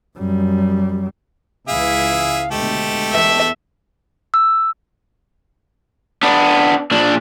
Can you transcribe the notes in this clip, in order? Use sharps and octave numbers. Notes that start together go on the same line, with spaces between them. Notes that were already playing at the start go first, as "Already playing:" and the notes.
F#2 G3
C#2 E3 E4 G#4 E5 F5
D2 B2 G#3 A3 G4 A4
E2 E5
E6
B3 D4
A#2 D4